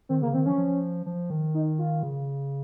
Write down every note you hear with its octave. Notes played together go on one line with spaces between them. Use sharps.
D#3 C4
C#3 A#3
D#3 C4
F3 C#4
F3
F3
D#3
D#4
F4
C#3